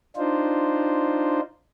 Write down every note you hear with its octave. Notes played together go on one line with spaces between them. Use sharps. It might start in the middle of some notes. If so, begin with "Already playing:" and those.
D4 D#4 F4 C5